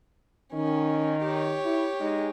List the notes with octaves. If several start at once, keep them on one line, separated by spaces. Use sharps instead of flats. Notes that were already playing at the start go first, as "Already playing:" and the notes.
D#3 C#4
G4 C#5
E4
G#3 D#4